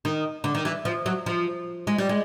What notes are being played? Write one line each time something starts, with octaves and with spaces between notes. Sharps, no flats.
D#3
D3
D#3
E3
F3
F#3
F3
G#3
G3
G#3